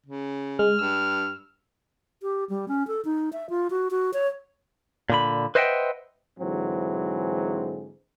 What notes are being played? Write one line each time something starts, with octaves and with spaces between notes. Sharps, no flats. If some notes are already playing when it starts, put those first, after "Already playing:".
C#3
G#3 F6
G2 E6
G4
G3
C#4
A4
D#4
E5
F4
F#4
F#4
C#5
A#2 D3 B5
B4 C5 D#5 E5 F#5 G5
G#2 D3 E3 F#3 G#3 C4